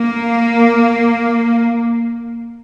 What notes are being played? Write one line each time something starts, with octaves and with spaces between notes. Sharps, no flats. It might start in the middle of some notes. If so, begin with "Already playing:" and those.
Already playing: A#3